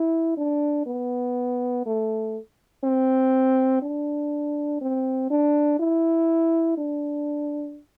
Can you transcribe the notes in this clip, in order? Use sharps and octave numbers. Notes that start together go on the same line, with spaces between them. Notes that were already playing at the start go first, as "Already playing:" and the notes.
Already playing: E4
D4
B3
A3
C4
D4
C4
D4
E4
D4